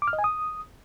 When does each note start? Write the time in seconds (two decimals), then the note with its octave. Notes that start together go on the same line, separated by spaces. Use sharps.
0.02 D6
0.08 F6
0.13 D#5
0.19 G#5
0.24 D#6